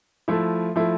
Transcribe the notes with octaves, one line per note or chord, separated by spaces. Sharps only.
F3 A3 E4
F3 A3 E4